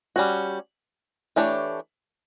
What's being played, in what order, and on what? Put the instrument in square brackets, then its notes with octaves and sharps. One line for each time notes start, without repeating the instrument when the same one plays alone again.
[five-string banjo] G3 C#4 F#4
E3 A3 D4 G4 C#5